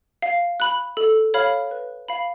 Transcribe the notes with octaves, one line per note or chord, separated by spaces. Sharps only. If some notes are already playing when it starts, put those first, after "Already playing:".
F5
B5 F#6
A4
C#5 F5 B5 F6
B4
F5 B5